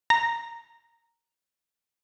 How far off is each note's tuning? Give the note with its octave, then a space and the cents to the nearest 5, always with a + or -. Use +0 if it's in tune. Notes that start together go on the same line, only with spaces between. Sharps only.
A#5 +0